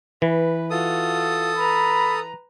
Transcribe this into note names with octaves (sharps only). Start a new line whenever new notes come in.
E3 B4
F4 F#4 A4 D#6
B4 A#5 B5